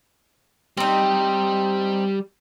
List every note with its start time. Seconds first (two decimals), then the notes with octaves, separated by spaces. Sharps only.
0.77 G3 C4 D#4